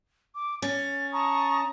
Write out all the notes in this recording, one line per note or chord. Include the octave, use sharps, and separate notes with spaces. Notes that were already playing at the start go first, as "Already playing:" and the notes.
D6
C#4 A6
A5 A#5 C#6 D#6